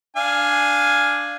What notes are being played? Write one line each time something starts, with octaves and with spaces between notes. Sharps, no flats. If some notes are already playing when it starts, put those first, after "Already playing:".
D4 F5 G#5